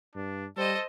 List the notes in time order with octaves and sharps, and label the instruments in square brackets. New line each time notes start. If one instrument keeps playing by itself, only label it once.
[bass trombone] G2 [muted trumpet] D4
[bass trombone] G3 [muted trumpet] A4 [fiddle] C5 D#5